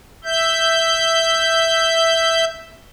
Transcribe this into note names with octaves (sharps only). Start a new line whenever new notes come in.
E5 G6